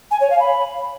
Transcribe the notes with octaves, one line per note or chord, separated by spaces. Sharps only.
G#5
C#5
F5
B5